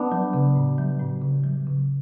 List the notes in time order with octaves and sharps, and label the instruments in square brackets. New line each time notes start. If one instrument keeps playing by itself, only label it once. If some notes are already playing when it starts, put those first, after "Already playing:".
Already playing: [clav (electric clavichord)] B3 D4
[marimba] F#3
C#3
A2
F#3
A2
C#3
F#3
C#3